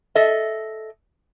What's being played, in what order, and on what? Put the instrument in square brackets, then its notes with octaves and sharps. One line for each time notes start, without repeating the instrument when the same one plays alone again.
[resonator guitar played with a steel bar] A4 D#5 E5